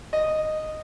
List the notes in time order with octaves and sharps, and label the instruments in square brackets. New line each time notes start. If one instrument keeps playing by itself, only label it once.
[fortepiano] D#5